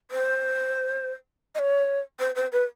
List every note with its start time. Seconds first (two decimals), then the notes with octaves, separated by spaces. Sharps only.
0.11 C5
1.55 D#5
1.59 C#5
2.20 C5
2.35 C5
2.52 B4